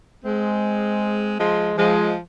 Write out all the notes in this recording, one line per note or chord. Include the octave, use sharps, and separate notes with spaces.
G#3 C4
F3 G#3
F3 G#3